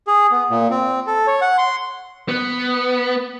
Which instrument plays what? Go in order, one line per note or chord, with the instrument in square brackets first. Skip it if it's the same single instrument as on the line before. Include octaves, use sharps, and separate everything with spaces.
[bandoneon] G#4
B3
A#2
C4
A4
C#5
F#5
C6
[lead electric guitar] B3